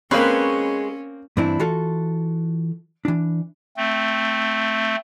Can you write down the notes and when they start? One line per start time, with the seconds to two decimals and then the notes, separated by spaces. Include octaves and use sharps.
0.11 G#3 A#3 C4 C#4 G#4 B4 C#5
1.37 G2 E3 C4 D4 E4
1.59 E3 F4 F#4 A4
3.05 E3 D4
3.77 A3 C4